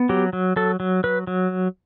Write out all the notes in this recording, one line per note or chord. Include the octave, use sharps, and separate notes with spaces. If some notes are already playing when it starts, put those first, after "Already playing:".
Already playing: B3
F#3 G4
F#3
F#3 A4
F#3
F#3 B4
F#3